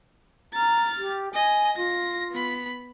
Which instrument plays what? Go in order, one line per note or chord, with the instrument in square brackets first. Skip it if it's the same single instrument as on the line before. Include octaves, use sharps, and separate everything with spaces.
[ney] A#5 [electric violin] F6 A6
[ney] G4
[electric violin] D#5 [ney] G#5
[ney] F4 [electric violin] A#6
[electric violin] B3 B5